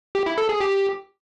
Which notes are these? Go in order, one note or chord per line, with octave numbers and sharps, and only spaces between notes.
G4
E4
A4
G#4
G4